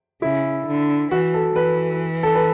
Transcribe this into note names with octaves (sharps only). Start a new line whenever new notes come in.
C#3 E4
D3
E3 F#4
A4
E3 B4
A4
B4